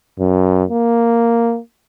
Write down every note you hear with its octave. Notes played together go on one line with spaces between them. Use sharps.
F#2
A#3